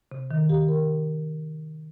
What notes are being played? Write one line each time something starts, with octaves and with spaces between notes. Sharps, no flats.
C3
D#3
G4
A#4